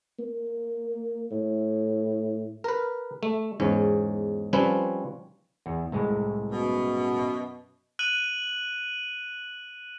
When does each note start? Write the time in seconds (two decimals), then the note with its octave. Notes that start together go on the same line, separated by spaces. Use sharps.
0.19 A#3
1.32 A2
2.64 A#4 B4
3.23 A3
3.60 E2 G#2 C#4
4.53 F3 G3 C4 C#4 B4 C#5
5.66 E2
5.92 C2 A2 G#3
6.51 F#2 B2
7.99 F#6 D#7 F#7